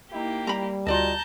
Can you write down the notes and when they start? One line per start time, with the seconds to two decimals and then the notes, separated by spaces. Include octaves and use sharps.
0.12 A#3 D#4 E4 G4
0.47 G3 A#5 B5
0.86 D2 F4 F#4 D5 D#5 A5 A#5 G6